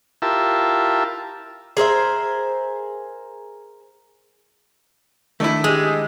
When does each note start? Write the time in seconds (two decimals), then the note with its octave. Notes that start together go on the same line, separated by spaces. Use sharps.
0.22 E4 F4 G4 A#4 E5 A5
1.77 G#4 A#4 C5 E5
5.40 D#3 A3 D4 E4 D#5
5.64 G#3 G4 G#4